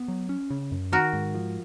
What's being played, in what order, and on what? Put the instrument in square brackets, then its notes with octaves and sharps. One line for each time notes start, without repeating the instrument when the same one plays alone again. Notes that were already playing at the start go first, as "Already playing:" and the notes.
Already playing: [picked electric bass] B3
F#3
C#4
C#3
F#2
[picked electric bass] D#3 [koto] F#4 A#4
[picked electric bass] G#2
F3